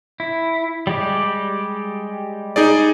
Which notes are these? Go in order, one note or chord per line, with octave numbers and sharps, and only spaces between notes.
E4
G3 G#3 G4
D#4 G#4 D5